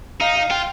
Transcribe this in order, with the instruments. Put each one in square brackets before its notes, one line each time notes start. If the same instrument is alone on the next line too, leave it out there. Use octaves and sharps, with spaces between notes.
[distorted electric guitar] D#4 [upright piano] F5
[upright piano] F5
[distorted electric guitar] F4 [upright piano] G5